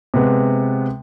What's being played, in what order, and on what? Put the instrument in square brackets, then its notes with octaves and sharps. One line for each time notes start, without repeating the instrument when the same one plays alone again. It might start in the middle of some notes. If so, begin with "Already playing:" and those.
[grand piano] C3 G#3 B3